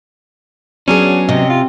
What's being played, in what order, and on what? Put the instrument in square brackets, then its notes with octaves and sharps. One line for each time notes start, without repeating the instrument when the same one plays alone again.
[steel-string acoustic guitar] F#3 B3 G#4 [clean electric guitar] C#4 [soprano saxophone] D4
[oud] C3 [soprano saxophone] D#5
[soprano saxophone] F4